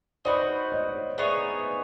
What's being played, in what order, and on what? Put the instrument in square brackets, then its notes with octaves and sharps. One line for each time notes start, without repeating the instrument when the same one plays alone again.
[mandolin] D#4 F#4 B4 [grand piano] C5 D5
[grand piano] C#5 D#5
[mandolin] B3 D#4 G#4 C#5 [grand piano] D5 E5